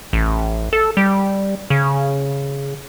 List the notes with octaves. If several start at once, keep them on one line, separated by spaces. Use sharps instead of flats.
A1
A4
G3
C#3